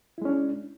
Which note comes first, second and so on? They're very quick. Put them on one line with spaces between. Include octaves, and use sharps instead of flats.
E4 G#3 C#4 D4